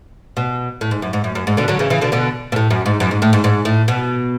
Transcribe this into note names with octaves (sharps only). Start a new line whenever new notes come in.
B2
A2
G#2
F#2
G#2
F#2
F#2
G#2
B2 D3
D3 F#3
C#3 E3
C#3 E3
B2 D3
B2 D3
B2
A2
F#2
G#2
F#2
G#2
A2
G#2
G#2
A2
B2